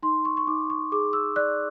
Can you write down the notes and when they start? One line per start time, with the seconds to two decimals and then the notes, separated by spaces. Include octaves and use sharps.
0.03 D#4 C6
0.25 C#6
0.37 C#6
0.47 D#4 D6
0.70 C#6
0.92 G#4 D6
1.13 E6
1.36 D5 F#6